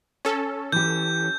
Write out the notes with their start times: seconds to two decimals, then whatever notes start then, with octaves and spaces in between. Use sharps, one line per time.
0.25 C#4 A4
0.72 E3 G4 G6